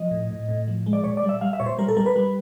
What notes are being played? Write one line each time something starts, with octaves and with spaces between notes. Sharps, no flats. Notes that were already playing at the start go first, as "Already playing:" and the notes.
Already playing: F3 D#5
A2
A2
A2
F3
G#3
D5
A#2 C#5
D5
G3
E5
G3 F5
E5
A#2 C#5
C5
G3 A#4
A4
G3 A#4
B4
G3